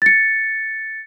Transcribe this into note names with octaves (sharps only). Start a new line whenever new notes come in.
A6 C#7